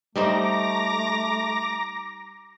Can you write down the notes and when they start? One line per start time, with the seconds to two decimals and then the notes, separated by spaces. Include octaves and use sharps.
0.16 G3 A3 D#4 C5 A#5 D6 A#6